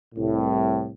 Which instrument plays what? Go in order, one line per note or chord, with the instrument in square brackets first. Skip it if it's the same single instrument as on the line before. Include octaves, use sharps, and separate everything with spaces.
[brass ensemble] C2 A2